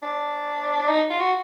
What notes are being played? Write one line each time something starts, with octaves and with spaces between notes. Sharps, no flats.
D4
D#4
F4
F#4